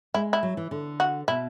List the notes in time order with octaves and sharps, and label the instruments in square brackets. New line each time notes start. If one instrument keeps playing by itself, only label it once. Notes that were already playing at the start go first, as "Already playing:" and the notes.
[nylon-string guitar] G#3 [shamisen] E4
[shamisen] E4
[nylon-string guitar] F#3
E3
D3
[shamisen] F#4
[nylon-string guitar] B2 [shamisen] E4